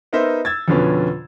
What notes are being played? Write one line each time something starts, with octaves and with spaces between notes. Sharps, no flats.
B3 D#4 A#4 C5 E5
E6 G#6 A6
F2 B2 D3 F3 B3 C#4